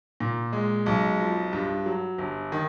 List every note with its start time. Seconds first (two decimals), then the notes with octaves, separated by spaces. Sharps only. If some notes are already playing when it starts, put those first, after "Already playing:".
0.20 A#2
0.53 G#3
0.86 B1
1.20 F3
1.53 G2
1.86 F#3
2.18 G1
2.52 D#3